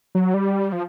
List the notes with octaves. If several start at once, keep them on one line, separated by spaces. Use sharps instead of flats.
F#3
G3
F3